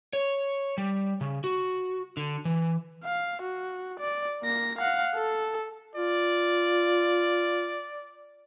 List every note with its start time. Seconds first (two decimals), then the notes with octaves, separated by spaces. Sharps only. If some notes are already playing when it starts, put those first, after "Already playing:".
0.13 C#5
0.78 G3
1.21 C#3
1.44 F#4
2.17 D3
2.45 E3
3.04 F5
3.42 F#4
4.00 D5
4.43 A#3 A#6
4.78 F5 F#5
5.15 A4
5.96 F4 D5